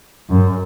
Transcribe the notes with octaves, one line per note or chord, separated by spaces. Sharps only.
F#2